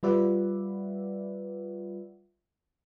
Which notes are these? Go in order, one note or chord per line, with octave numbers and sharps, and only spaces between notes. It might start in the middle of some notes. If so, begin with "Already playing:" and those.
G3 F4 B4 D5 E5 F#5